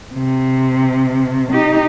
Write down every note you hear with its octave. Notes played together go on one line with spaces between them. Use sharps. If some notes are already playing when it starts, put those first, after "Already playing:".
C3
D#4 G4